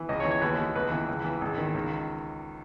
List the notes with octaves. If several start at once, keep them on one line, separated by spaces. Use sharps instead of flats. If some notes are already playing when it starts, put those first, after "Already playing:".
Already playing: E3
C#2 D#5
C#5
E3
C#5
D#2 B4
D#2
C#2 B4
E3
C#2
E3
G#1
D#3
C#2